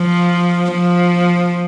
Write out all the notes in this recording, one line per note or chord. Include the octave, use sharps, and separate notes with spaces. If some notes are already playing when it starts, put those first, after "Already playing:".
Already playing: F3
F3